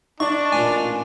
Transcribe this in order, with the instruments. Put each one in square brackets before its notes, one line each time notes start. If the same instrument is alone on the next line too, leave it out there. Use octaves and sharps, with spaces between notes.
[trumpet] D4 [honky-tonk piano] D#4 D5 [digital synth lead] C#6
[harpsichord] A1 A#2 F4 [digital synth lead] G#5